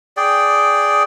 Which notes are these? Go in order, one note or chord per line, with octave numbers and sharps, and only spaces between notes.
G#4 D5 G5